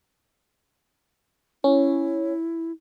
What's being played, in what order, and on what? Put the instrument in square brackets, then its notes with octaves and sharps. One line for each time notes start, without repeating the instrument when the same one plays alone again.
[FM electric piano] C#4 [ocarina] E4